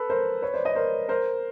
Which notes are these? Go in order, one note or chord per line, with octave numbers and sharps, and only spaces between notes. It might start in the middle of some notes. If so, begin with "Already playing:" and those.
Already playing: A4 B4
A#4 C5
B4 C#5
C5 D5
C#5 D#5
A#4 C5
A#4 C5